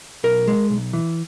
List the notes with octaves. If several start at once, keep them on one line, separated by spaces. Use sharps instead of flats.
B1 A#4
G#3
B1
E3